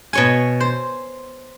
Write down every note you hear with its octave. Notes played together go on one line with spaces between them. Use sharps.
B2 C#5 G#5
C5